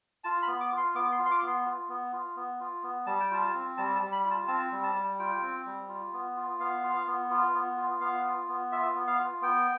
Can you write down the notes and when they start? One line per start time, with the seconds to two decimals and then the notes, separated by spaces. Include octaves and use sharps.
0.24 F4 A5
0.42 B5
0.48 B3
0.60 D6
0.72 F4
0.77 C6
0.95 B3 D6
1.12 C6
1.19 F4
1.26 C6
1.31 D6
1.42 B3
1.48 C6
1.65 F4
1.89 B3
2.13 F4
2.36 B3
2.60 F4
2.83 B3
3.06 G3 A5
3.20 G5
3.31 F4 A5
3.54 C4
3.78 G3 A5
3.95 A5
4.02 G3
4.12 B5
4.25 F4
4.31 A5
4.48 C4 A5
4.72 G3
4.83 A5
4.95 G3
5.19 F4 G5
5.43 C4
5.66 G3
5.89 F4
6.13 B3
6.37 F4
6.59 B3 F5
6.84 F4
7.07 B3
7.30 F4
7.55 B3
7.77 F4
8.01 B3 F5
8.24 F4
8.49 B3
8.72 F4 E5
8.95 B3
9.07 F5
9.19 F4
9.42 B3 G5